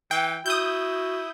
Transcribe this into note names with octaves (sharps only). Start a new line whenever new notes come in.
E3 G5
E4 F#4 D#6 G6